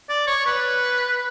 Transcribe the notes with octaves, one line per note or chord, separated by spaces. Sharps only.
D5
C#5
B4